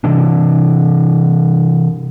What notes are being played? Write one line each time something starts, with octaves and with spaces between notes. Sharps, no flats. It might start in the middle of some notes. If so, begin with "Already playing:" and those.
C3 E3 D4